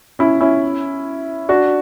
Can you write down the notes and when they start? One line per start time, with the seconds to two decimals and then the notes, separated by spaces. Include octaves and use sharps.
0.19 C#4 E4
0.41 C#4 E4
1.49 D4 F#4